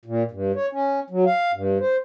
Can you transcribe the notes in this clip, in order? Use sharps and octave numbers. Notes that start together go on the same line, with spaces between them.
A#2
G2
C#5
C#4
F#3
F5
G2
C5